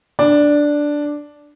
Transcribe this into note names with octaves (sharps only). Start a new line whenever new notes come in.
D4